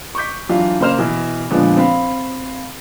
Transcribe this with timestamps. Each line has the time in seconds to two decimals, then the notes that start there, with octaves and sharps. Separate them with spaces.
0.15 C#6 D6 G6 B6
0.49 E3 F#3 D4 F4
0.80 C#3 A#3 C5 F6 E7
0.98 B2 E3
1.50 A#2 D3 F3 G#3 B3 D4
1.77 C4 F5 B5